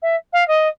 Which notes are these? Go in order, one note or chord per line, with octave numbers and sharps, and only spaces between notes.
E5
F5
D#5